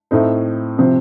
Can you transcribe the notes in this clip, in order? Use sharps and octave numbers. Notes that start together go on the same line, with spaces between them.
A2 A3 C4 D#4
C3 F3 C4